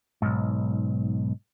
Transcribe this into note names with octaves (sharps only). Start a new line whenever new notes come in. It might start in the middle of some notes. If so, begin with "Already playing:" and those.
B1 G#2